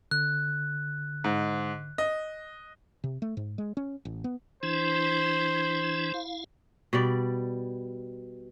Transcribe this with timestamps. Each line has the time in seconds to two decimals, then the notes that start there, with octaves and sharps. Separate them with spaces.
0.11 D3 F#6
1.24 G#2
1.98 D#5
3.04 C3
3.22 A3
3.37 G#2
3.58 G#3
3.77 C#4
4.05 A1
4.24 B3
4.63 E3 D4 E4 C5
6.14 E4 F5
6.93 B2 G3 D5